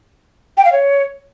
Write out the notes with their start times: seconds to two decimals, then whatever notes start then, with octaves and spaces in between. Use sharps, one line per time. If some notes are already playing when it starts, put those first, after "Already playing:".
0.57 G5
0.65 F5
0.72 C#5